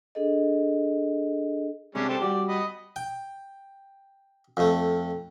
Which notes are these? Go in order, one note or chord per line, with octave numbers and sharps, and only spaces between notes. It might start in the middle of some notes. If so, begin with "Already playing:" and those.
D4 G#4 A4 D#5
C3 G3 G#3 C#4 D4
G4 A4 C5
G3 F#4 G4 D5
D#5 B5
G5
F2 A3